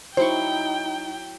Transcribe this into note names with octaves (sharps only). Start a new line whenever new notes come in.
F#3 D#4 E4 C5 G5 C#6